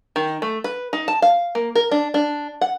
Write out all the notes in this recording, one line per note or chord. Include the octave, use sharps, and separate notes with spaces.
D#3
A3
B4
D#4
A5
F5
A#3
A#4
D4
D4
F#5